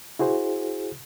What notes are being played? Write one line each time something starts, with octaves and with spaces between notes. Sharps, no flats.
E4 F#4 G#4 C5